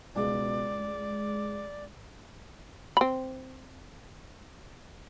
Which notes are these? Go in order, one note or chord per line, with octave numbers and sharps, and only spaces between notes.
C#2 B2 G#4 D5
G#3
C4 B5